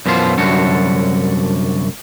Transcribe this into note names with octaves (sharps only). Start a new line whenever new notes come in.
F#2 B2 E3 F4 C5
C2 F#2 D3 D4 F#4